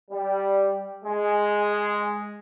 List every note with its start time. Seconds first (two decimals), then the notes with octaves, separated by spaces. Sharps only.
0.11 G3
1.05 G#3